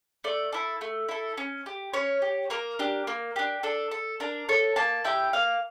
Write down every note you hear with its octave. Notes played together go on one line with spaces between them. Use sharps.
A3 D5
E4 A4
A3
E4 A4
C#4
G4
C#4 C#5
G4
A#3 A#4
D4 G4
A#3
D4 G4
D4 A4
A4
D4 A#4
A4 C#5
A#3 A5
E4 G4 G5
A#3 F5